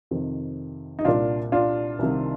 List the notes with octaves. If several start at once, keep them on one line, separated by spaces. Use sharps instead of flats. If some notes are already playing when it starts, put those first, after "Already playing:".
F2 C3 D#3
D#4
C2 A#2 D4 F4
D4 F4
C2 C3 D#3